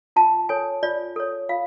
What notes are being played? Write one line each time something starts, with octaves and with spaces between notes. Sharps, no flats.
F4 A5
A4 C#5 G#5
F4 D5
A4 C#5
F4 F5